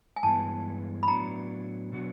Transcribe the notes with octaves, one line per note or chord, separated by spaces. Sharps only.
G#5
G2 E3 G#3 B3 A5
B5
A2 F#3 B3 D4 A#5
B2 F#3 B3 D4 F#4